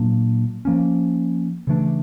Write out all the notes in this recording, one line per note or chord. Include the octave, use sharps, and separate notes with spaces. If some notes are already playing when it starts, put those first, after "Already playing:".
Already playing: A#2 F#3 A#3 D4
F3 A#3 C#4
C#3 E3 A3 D4